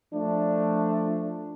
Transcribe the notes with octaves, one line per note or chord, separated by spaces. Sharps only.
F3 A3 D4